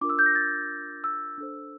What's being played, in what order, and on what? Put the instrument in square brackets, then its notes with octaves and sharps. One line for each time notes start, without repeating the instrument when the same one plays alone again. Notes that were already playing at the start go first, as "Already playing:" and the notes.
[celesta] D4 F4 A#4 D6
E6
G6
A#6
A6
E6
D4 A4 C5